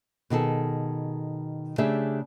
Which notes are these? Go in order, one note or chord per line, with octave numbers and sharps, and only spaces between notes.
B2 D#3 G#4 A4
C#3 A3 D4 G4 G#4 E5